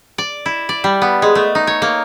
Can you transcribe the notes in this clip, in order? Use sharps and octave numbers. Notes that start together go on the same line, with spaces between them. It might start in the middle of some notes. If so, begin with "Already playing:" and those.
D5
E4
D5
G3
B3
G#3
A3
D#4
C#5
A#3